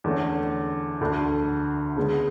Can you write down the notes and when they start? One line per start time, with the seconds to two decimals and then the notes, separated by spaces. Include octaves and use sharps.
0.04 E2 D3 A3 C#4
1.01 D2 D3 A3 D4
1.96 C#3 G#3 B3